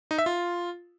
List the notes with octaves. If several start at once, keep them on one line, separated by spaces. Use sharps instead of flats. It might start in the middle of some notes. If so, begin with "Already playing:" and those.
D#4
E5
F4